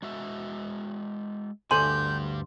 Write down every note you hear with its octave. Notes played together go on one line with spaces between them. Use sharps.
G#3 F#4 E5
D2 G2 G3 G4 A4 G#5 C6 G6